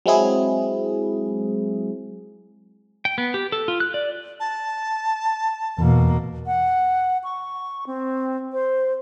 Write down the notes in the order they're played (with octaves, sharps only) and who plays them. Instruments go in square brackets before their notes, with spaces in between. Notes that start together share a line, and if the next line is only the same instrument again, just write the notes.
[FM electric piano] F#3 G#3 C4 E4 G#4
[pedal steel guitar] G5
B3
G4
A4
F4
F#6
D5
[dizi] A5
[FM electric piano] E2 [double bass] B2 A#3
[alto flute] F#5
C#6
C4
C5